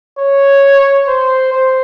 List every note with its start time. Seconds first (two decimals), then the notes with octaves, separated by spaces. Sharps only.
0.19 C#5
1.08 C5
1.53 C5